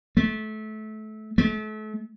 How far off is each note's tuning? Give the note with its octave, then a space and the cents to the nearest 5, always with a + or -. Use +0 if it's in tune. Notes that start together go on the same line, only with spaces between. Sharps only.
A3 -25
A3 -40